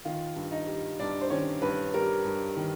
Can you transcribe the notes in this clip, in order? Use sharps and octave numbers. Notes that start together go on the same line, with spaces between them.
D#3 F4 F5
G2
D#4 D#5
G3
G2 D4 D5
C5
D#3 C#4 C#5
G2 B4
G3 A#4
G2
D#3